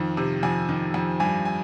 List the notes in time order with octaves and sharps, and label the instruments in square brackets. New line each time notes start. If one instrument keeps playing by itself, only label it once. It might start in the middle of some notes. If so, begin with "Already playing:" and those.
Already playing: [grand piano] F2 D#3
C3
F2 G#5
D#3
F2
G2 G#5
G#5